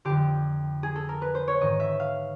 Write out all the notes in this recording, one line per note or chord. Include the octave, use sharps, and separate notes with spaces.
F2 D3 G4
G#4
A4
A#4
B4
C5
C#5
G#2 D#3 D#5
E5
F5